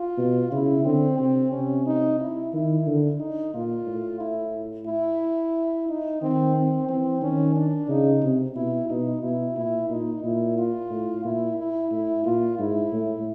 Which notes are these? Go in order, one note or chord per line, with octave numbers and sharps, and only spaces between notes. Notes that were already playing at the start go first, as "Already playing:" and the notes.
Already playing: F4
B2
C#3 E4
D3 C4
C3 C4
C3 C#4
D#4
E4
D#3 E4
D3
D#4
A#2 F4
A2
E4
E4
D#4
D#3 C4
C4
E3 C4
D#3 C#4
D4
C#3 D#4
C3
B2 E4
B2 D#4
B2 E4
A#2 E4
A#2 D#4
A#2 E4
F4
A2
A#2 E4
E4
A2 E4
A#2 F4
G#2 E4
A2